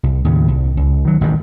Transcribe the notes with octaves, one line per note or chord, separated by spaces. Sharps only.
C2
D#2 A2 C#3
C2
C#2
D#3 F#3
A1 G2 D#3